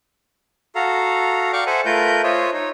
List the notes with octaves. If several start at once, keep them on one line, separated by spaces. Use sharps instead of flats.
F#4 A4 F5 A#5
D5 F5 G5 C#6 D6
A4 C5 E5 F#5 G#5
A3 F4 A#4 B4 G6
F4 C5 C#5 D#5 E5
D#4 C#5